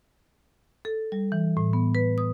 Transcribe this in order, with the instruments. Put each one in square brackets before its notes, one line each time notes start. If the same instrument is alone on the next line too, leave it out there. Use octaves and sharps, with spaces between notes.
[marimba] A4
G3
E3
A2
B3
B4
D#6